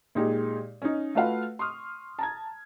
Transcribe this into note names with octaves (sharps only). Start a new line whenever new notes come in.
A#2 G#3 D#4 G4 G#4
C#4 D#4
A3 F4 F#4 B4 F5 F#5
C6 C#6 D#6 F6
A5 A#5 G#6